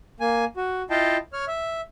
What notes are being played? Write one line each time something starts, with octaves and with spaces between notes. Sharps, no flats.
A#3 G#5
F#4
E4 F4 D#5 F5 G5 A5
C#5 F6
E5